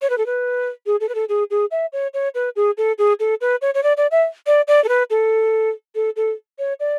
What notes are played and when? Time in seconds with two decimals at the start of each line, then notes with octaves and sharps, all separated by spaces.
0.02 C#5
0.10 B4
0.18 A4
0.26 B4
0.86 G#4
1.00 A4
1.09 B4
1.15 A4
1.29 G#4
1.51 G#4
1.71 E5
1.93 C#5
2.14 C#5
2.35 B4
2.56 G#4
2.78 A4
2.98 G#4
3.20 A4
3.41 B4
3.62 C#5
3.75 C#5
3.83 D5
3.97 D5
4.11 E5
4.47 D5
4.68 D5
4.84 A4
4.89 B4
5.10 A4
5.95 A4
6.16 A4
6.59 C#5
6.80 D5